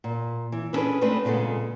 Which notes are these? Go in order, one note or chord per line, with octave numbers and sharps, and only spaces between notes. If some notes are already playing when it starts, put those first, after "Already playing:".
A#2
E3
B3 C#4 D4 G#4 A4 B4
G#3 A3 C4 D4 B4
A#2 C#3 G#3 B3 A4